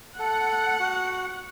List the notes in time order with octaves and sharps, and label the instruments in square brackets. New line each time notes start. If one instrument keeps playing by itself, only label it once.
[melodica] A4 [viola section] F#5
[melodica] F#4